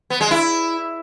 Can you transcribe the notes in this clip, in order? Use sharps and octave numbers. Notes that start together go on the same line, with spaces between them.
B3
G#3
E4